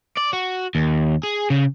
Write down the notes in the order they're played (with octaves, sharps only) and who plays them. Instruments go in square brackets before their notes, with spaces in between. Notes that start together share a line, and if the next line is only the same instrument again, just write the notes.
[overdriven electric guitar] D5
F#4
D#2
G#4
C#3